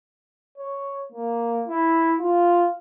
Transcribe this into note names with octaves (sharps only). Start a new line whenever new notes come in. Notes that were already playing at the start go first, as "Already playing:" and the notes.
C#5
A#3
E4
F4